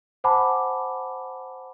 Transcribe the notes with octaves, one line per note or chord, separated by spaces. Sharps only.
C5 F#5 G#5 A5 B5 D6